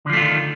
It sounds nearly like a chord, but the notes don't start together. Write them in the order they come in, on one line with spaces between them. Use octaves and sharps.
D3 F3 A3 F4 D#3